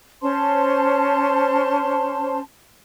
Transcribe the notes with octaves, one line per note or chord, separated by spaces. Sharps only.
C#4 C5 A5 C6